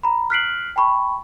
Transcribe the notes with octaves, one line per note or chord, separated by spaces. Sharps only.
A#5 B5
F6 F#6 B6 C7 D7 F#7
G5 A5 B5 C#6